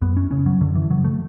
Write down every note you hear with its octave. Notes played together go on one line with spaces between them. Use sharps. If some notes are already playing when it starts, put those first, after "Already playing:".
F#2 B3
C#4
C#3 C#4
F#3
F#2 D3
E3
C#3 F#3
A3